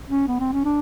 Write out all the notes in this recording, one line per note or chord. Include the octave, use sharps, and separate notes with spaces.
C#4
B3
C4
C#4
D4